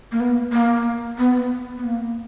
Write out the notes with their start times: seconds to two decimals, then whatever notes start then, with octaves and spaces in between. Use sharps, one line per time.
0.12 A#3
0.20 B3
0.53 A#3
1.18 B3
1.77 B3
1.84 A#3